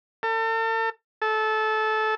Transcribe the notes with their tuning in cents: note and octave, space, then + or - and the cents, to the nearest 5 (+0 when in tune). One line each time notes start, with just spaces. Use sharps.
A4 +40
A4 -20